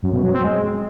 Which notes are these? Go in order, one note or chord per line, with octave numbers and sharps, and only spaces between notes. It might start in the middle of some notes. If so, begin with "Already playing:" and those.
F#2
B2
F#3
C4
G#3